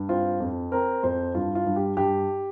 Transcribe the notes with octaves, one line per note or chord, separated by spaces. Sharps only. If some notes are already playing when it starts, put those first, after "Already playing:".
Already playing: G2
C4 F4
F2
C4 A#4
F2 C5
G2 F4
F4
G2
G4
G2 G4